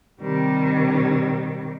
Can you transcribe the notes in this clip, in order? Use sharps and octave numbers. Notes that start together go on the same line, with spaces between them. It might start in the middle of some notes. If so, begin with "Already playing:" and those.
C3 D#3 G3